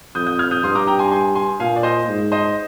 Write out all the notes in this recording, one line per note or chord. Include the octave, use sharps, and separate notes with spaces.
F2 D#6 G6
D#6 G6
F6 G#6
D#6 G6
G2 C6 D#6
A#5 D6
G5 A#5
G#5 C6
G#5 C6
G#5 C6
A#2 F5 G#5
D5
C5 D#5
G#2
C5 D#5